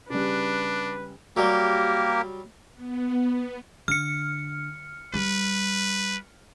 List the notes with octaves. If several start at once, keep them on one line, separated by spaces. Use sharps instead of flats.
C#3 G3 D4 B4
F#3 G3 A#3 G4 A#4
B3
D3 F6 C#7
G3 B4